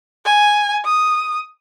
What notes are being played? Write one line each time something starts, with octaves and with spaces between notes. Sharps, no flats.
G#5
D#6